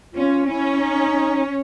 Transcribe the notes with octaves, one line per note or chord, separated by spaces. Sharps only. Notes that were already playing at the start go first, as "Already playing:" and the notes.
C#4 F4
C#4 E4
D#4